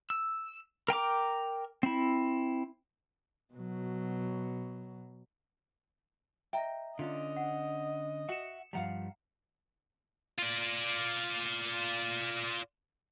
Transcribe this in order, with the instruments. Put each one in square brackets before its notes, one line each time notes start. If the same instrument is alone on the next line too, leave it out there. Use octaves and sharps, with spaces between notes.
[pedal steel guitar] E6
A#4 G5 A#5 D6
C4 E4
[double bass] B2 F#3
[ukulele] D#5 G5 [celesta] E5 A#5
[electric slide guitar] D3 C#4 [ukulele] D4 F4 [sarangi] D#5
[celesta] F#5
[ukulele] F#4 [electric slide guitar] E5 F#5 [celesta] C#7 E7
[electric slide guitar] G2 F3 G3 [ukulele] F5 F#5 A#5
[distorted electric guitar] F4 D5